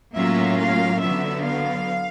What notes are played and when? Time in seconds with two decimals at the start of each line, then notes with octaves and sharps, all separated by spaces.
0.15 A2 F#3 A#3 C#4 F4 E5
0.59 F5
1.02 D3 F#3 B3 E5
1.45 F5